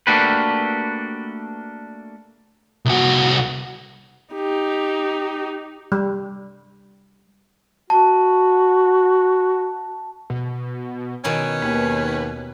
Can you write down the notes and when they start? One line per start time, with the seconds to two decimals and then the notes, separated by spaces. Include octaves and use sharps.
0.07 A3 A#3 D4 F#4 G4 B4
2.85 C2 F#4
4.34 D#4 G4
5.92 G3
7.90 F#4 A5
10.30 B2
11.24 B2 D#3 C#4 E4
11.62 D#2 B4